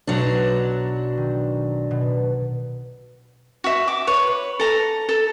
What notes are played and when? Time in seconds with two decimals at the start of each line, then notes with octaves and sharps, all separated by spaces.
0.07 B1 B2 F#3 D4
1.17 D#3
1.91 B2
3.64 F#4 E5
3.88 D6
4.07 B4 C#5
4.60 A4 A#5
5.09 A4